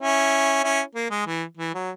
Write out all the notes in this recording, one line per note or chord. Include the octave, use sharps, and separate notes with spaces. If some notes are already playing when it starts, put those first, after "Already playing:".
C#4 E4
C#4 E4
A#3
G#3
E3
E3
F#3